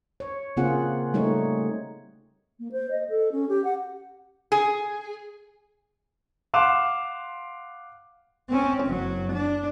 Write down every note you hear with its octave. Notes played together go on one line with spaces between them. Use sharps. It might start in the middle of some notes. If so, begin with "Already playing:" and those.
C#5
C#3 A#3 C4 F4 G#4 F#5
G3 A3 D#4 C#5
A#3
C5
D#5
A4
C#4
G4
F#5
G#4
F5 F#5 C6 D6 F#6 E7
C4 C#4
F#1 F#3
D4